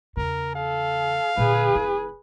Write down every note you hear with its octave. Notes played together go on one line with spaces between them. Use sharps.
E2 C#3 A#4
A4 F5
A#2 D3 G#4 B4
F1 E4